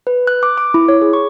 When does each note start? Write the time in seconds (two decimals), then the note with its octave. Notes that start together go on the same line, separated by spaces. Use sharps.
0.07 B4
0.27 F#6
0.43 D6
0.58 D6
0.74 E4
0.88 C#5
1.02 G#4
1.13 C#6